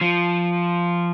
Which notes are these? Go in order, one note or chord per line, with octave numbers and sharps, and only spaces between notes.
F3